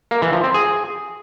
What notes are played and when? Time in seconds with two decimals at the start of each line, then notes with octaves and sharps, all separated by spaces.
0.11 A#3
0.22 E3
0.33 F3
0.44 C4
0.54 G#4